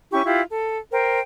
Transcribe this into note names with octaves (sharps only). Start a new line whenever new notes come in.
C#4 E4 G4 C#6
E4 F4 G4
A4
A#4 C5 G5